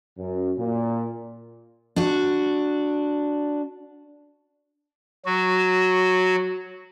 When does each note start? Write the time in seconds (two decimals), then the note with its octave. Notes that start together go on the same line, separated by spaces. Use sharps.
0.18 F#2
0.58 A#2
1.96 D4 F#4
5.25 F#3 F#4